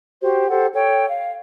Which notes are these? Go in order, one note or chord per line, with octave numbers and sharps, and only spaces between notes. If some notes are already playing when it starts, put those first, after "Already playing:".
F#4 G4 C5
G4 A4 C5 F#5
A4 C#5 G5
F5